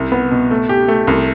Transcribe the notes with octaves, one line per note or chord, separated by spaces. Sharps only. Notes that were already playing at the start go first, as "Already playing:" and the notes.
Already playing: C2
B3
B2
A3
G4
A3
C2